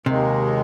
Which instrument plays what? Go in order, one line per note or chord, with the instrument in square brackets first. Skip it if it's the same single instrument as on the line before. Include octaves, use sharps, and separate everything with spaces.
[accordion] D#2 D#3 G#3 [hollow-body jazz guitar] C3